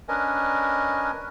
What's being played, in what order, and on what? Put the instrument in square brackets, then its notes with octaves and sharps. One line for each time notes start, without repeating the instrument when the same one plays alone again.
[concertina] C#4 D4 A#4 B4 D#5 G#5